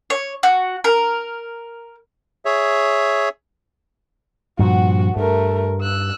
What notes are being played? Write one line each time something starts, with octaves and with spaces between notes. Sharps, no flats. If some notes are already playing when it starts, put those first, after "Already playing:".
C#5
F#4
A#4
G#4 C#5 E5
G2 A#2 F3 F#4 F#5
G2 A3 A#4
E6 F#6